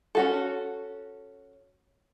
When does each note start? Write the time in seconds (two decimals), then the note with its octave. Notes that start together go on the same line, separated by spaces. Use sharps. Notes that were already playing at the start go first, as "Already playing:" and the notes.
0.15 C#4 F#4 A4